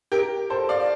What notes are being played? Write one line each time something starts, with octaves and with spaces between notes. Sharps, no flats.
G4 A#4
A4 C5
D5 F5